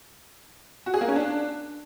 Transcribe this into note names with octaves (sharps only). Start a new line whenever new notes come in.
F#4
G#4
A#3
C#4
D4